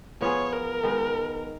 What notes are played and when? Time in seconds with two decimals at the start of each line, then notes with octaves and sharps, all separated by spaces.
0.21 F3 B3 F4 G#4 C#5
0.52 A#4
0.83 D#3 G#3 B3